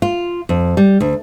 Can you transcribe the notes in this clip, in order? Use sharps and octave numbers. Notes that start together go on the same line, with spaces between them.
F4
F2
G3
D2